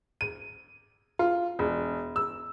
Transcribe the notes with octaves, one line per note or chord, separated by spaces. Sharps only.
D#7
F4
E1
E6